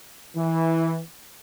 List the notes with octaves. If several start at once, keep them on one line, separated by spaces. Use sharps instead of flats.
E3